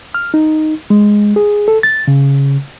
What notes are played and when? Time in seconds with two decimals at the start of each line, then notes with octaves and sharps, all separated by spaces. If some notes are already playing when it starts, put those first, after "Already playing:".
0.15 F6
0.34 D#4
0.90 G#3
1.36 G#4
1.68 A4
1.83 A6
2.08 C#3